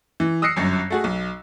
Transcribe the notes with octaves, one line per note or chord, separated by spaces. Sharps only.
E3
D#6 E6 F#6 A#6 C7 C#7
G1 F#2
A3 F#4 G#4
B1